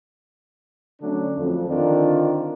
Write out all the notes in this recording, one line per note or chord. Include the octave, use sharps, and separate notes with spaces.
D3 F#3 A3 C#4 D4
F2
D3 D#3 C4 D4 D#4 F4